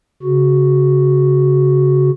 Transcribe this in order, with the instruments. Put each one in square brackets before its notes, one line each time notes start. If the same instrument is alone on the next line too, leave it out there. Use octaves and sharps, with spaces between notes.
[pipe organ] C#3 F#4